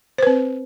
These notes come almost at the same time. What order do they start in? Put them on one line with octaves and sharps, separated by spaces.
C5 B4 C4